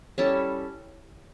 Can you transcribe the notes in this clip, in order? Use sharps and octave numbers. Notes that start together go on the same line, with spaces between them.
G3 C#4 E4 A4